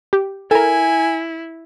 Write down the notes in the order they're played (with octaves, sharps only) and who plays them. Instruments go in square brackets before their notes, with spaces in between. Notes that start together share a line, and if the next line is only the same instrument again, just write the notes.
[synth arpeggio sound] G4
[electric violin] E4 [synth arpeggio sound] A4 A#4 [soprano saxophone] G#5